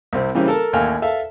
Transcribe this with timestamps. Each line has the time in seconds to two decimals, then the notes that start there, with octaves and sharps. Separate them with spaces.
0.13 C2 C3 C4
0.35 C#3 E3 G3 A#3 C4 C#4
0.48 A4 A#4 A5
0.73 A1 D#2 F5 G#5 F6
1.02 A4 E5 F5 A5